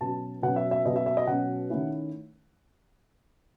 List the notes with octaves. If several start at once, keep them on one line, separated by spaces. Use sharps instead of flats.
B2 F#3 C#4 A5
B2 F#3 C#4 F#5
E5
E5
B2 F#3 C#4 D#5
E5
E5
D#5
B2 F#3 C#4 F#5
D#3 A3 C#4 E4